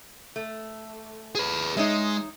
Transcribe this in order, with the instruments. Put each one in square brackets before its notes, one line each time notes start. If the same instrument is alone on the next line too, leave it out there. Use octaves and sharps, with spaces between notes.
[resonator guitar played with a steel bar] A3
[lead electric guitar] G#4 B4
[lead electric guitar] G#3 [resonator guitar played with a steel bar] D#4 C#5 E5